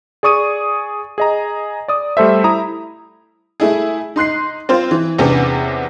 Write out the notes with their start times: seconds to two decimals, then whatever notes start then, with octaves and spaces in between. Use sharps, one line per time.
0.23 G#4 D5 C#6 D#6 D#7
1.18 G#4 D#5 A#5
1.88 D5 D#6
2.17 G3 A3 A4 C5 E5
2.44 E4 A#5 D#6
3.60 A3 E4 G#4
4.16 D#4 C6 F#6 C7
4.69 C4 F4 C5
4.91 E3
5.19 E2 C3 B3 C#4 D4